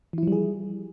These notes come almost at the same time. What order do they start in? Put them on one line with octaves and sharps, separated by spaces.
E3 E4 F3 G3 G#4